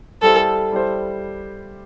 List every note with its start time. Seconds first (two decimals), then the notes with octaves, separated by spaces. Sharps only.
0.22 G3 E4 G4 A4 C5
0.72 G3 E4 G4 C5